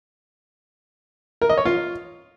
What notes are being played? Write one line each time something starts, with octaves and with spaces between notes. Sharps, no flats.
A#4
D#5
C#5
F4